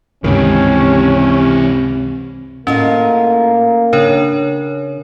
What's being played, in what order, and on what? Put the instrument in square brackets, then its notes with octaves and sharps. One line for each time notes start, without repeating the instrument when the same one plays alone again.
[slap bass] C#2 G2 D#3 [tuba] C3 [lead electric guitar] E3 G4 [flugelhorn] C#4
[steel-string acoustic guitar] A2 F4 D#5 [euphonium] A#3 [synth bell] C#4
[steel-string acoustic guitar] C#3 [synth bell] D4 A#4 C#5